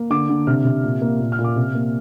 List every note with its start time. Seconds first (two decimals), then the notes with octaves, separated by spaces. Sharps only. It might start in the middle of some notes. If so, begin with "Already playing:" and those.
Already playing: A#3
0.10 D3 D6
0.29 D3
0.47 C3 F6
0.65 C3
0.83 A#2
1.02 A#3
1.20 A#2
1.32 F6
1.38 A#2
1.44 D6
1.56 C3
1.75 A#3